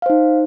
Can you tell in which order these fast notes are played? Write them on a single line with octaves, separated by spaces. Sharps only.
F5 C5 D#4